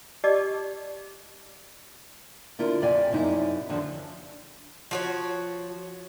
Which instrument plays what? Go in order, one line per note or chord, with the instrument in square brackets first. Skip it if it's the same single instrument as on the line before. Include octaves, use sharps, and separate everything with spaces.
[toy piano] G4 D5 D#5 A5 C#6 D6
[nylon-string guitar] D3 E4 F4 A#4
F2 C3 D5 F5 G#5
F#2 C3 A#3 D#4 E4
D#2 D3 F3 D5
[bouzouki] F3 F#4 C#5